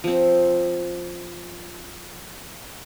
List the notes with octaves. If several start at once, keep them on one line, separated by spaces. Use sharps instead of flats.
F3 C4